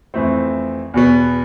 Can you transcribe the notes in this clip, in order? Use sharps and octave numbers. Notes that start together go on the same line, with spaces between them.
F2 E3 A3 C4
E2 B2 B3